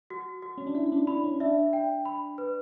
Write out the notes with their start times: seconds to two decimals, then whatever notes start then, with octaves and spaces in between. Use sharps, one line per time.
0.10 F#4
0.42 F#4
0.58 C#4
0.67 D4
0.75 E4 F#4
0.92 D4
1.07 D4 B5
1.24 C#4
1.40 D4 E5
1.73 G5
2.05 B5
2.38 B4